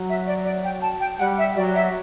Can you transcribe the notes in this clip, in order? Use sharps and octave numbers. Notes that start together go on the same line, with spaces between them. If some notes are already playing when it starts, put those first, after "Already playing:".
Already playing: F#3
E5
D5
D5
G5
A5
G5
G3 F#5
E5
F#3 D5
E5